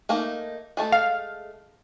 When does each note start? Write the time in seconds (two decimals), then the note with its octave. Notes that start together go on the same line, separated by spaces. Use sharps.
0.09 A3 A#3 D#4
0.77 G#3 A3 A4
0.92 F5